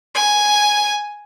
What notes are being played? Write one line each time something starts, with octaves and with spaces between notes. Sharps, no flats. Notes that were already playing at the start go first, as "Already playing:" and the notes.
G#5